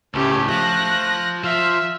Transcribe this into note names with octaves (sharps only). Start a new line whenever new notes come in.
C#2 A2 A3 C#4 G4
F3 F#6 A#6
F3 E5 F5